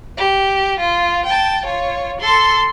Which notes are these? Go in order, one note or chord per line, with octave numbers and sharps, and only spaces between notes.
G4
F4
G5 A5
F4 C#5
A4 C6